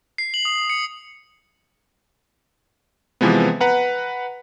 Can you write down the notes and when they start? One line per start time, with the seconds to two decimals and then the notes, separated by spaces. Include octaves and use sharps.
0.18 C7
0.34 F#7
0.45 D#6
0.70 C#7
3.21 C3 E3 F3 G#3 B3
3.61 B4 F#5 A#5